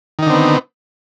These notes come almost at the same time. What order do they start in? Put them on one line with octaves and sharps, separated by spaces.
D#3 D#4 D3 C4 B3